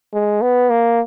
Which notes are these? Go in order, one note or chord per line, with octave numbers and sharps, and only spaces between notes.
G#3
B3
A#3